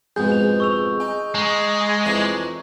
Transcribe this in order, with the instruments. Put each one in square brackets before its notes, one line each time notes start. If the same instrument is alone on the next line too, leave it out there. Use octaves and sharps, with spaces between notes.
[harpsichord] F2 G#2 B2 [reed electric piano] G#4 [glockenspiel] G6
[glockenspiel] F7
C#6 E6 F7
[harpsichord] D#4 [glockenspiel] G#5
[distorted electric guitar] G#3 [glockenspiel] A#5 C#6
[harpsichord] F2 E3 D4